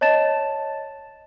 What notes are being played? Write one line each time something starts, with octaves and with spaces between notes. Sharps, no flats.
C#5 D#5 A5 A6 E7